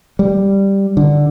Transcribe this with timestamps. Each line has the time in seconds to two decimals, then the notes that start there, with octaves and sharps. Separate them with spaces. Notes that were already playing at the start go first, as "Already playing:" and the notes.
0.19 G3
0.97 D3